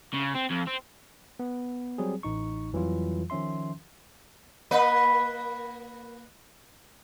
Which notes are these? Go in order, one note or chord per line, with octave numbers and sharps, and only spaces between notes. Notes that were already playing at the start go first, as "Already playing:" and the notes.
C#3
C4
F2
C4
B3
F#3 G3 C4 G#4
A1 D#4 C#6
F2 E3 F#3 G3 F4
D#3 F3 C#4 E5 C6
A#3 B4 D#5